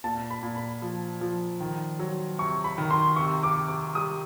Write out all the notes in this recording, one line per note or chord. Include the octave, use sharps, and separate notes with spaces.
A#2 A5
B5
A#2
B5
F3
F3
D#3
F#3
C3 C#6
B5
D#3
C6
C3 C#6
D6
C3
D6
G3 D#6